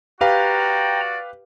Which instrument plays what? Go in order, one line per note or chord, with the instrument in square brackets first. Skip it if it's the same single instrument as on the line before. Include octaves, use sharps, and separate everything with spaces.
[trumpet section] F#4 D5 [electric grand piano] G4 B4 F5 [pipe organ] G5 A#5